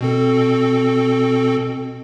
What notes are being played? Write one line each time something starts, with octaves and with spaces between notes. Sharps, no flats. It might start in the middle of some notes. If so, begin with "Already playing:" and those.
B2 C4 A4